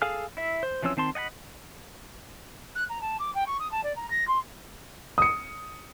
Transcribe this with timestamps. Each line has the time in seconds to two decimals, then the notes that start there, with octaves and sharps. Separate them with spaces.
0.02 G#4 A4 F5 G#5 F6
0.37 E4 E5
0.63 C5
0.83 E3 F3 C4 C#4 E6
0.97 D#3 C4 A5 C6
1.15 D#5 F#5 G#5 B5
2.75 F#6
2.89 A#5
3.01 A5
3.19 D6
3.34 G5
3.46 C#6
3.59 D#6
3.71 A5
3.83 D5
3.95 A#5
4.10 A#6
4.27 C6
5.18 D#6 C#7